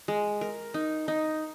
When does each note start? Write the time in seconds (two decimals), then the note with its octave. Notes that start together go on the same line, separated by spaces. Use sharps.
0.08 G#3
0.41 A#4
0.74 D#4
1.08 D#4